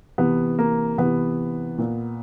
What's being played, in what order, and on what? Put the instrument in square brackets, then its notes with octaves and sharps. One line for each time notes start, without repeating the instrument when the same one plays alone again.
[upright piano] C3 E3 B3
A#3
C3 E3 B3
A#2